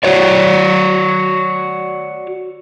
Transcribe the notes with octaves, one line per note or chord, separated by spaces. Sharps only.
F#4 C#5 D5